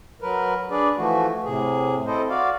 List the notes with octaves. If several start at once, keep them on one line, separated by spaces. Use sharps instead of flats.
F#3 A#4 B4
D4 G#4 B4 D5
E3 F3 A3 F#4
A2 C3 G#4
C4 E4 A4 C5 D#5
F#4 D5 F5